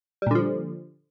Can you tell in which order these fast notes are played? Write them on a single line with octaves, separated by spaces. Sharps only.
G3 A#2 D3 F3